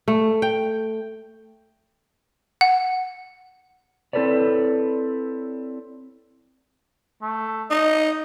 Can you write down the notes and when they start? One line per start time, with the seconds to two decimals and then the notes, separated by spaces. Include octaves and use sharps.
0.08 A3
0.42 G5
2.61 F#5
4.13 C4 E4 A4 B4 C#5 D5
7.22 A3
7.71 D#4 D#5